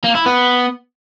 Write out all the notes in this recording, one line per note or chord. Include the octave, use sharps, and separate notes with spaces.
A#3
E4
B3